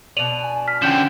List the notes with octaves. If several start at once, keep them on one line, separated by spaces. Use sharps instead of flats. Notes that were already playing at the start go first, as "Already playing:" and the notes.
B2 D4 D#7 F7 F#7
G#5
F6 B6
D3 F3 C#4 G5 G6 E7